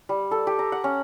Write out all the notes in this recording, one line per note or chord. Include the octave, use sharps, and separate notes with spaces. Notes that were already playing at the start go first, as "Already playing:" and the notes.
G3
A4
G4
A#5
F#5
C#4